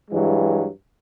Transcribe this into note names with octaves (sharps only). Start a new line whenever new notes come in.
G2 E3 F#3 G#3